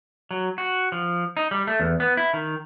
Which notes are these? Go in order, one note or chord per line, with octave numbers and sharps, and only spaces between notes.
F#3
F#4
F3
D#4
G3
A3
E2
B3
E4
D#3